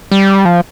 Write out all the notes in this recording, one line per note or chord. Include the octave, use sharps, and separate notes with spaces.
G3
F3